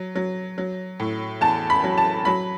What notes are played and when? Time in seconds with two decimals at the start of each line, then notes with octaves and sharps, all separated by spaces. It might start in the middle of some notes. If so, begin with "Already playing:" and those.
Already playing: F#3
0.15 F#3
0.58 F#3
1.00 A2
1.41 E2 A5
1.70 B5
1.84 F#3
1.98 A5
2.25 F#3 B5